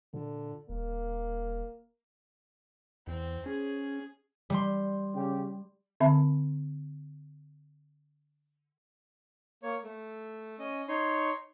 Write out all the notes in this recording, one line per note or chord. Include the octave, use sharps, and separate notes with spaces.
A#2 D3
D#1 A#3
E2 C4
C#4 G#4
G3 C6
C#3 C#4 G4
D3 C4 E5 B5
A#3 C#5
A3
C#4 D#5
D#4 C#5 C6